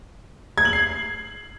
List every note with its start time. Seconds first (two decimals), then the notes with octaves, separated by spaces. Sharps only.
0.58 G#6
0.65 F#7
0.73 C7